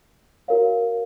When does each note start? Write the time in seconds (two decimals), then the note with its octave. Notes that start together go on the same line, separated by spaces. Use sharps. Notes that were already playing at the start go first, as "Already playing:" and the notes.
0.48 F#4 A#4 C#5 F5